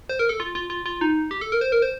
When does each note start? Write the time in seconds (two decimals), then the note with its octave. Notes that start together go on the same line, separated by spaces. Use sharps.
0.09 C5
0.19 A#4
0.29 A4
0.40 F4
0.55 F4
0.70 F4
0.86 F4
1.01 D#4
1.31 G4
1.41 A4
1.52 A#4
1.61 C5
1.72 A#4
1.82 C5